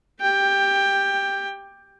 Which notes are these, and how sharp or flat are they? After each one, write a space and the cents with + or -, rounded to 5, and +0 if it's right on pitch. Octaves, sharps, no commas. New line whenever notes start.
G4 +0 G5 +15